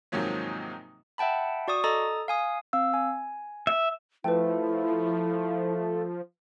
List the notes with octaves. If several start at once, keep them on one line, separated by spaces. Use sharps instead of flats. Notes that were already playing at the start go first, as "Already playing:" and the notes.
G#2 C3 D#3 F3 F#3 A#3
E5 F#5 G5 A5 B5
F#4 D5 C#6 D#6
A4 D#5 A#5 D#6 A6
F5 G#5 D#6
C4 F5 E6
G#5
E5
F3 A3 E4 B4 G5